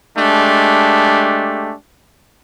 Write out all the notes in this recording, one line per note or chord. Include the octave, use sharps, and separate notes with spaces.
G#3 A3 D4 G4